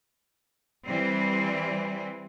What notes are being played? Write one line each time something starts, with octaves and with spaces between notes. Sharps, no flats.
E3 G3 C4